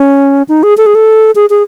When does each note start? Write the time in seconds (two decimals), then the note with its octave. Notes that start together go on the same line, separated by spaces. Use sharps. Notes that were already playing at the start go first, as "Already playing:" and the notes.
Already playing: C#4
0.48 D#4
0.63 G#4
0.77 A4
0.86 G#4
0.95 A4
1.35 G#4
1.50 G#4